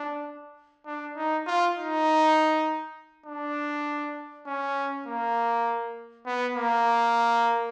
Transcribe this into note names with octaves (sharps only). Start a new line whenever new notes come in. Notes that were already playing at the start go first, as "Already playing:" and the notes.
Already playing: D4
D4
D#4
F4
D#4
D4
C#4
A#3
B3
A#3